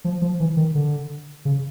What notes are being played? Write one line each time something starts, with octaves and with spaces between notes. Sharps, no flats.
F3
F3
E3
D#3
D3
C#3